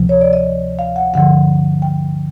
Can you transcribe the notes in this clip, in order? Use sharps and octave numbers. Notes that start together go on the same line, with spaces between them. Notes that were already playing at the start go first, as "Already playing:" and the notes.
Already playing: D2 C3 F3
C#5
D5
D#5
F5
F#5
G2 D3 F3 F#5
G5